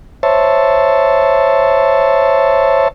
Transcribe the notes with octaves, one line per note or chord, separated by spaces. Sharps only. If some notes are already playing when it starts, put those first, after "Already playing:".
C5 C#5 E5 A5